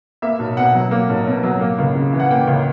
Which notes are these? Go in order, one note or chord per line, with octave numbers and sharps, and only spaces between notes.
A#3 E5
B1
B2 F#5
F#3
A#3
B1
B2
F#3
A#3
C#2
C#3
E3
F#5
A#3 G5
C#2